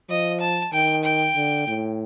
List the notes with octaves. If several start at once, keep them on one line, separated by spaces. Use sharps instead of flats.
F3 D#5
A5
D#3 G5
G5
D3
A2